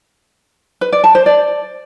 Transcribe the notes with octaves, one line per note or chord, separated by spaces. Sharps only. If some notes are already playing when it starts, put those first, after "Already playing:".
B4
D5
A5
C5
D5